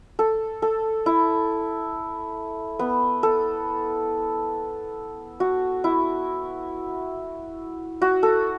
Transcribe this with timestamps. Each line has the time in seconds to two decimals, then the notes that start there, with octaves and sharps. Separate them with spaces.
0.19 A4
0.62 A4
1.06 E4
2.79 B3
3.23 A4
5.40 F#4
5.84 E4
8.02 F#4
8.23 A4